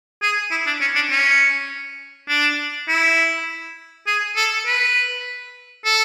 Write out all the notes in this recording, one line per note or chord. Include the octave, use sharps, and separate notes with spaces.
G#4
E4
D4
C#4
D4
C#4
D4
E4
G#4
A4
B4
A4